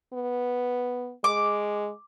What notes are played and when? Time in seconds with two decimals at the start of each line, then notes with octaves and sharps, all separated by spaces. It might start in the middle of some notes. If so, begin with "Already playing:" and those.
0.13 B3
1.24 G#3 D6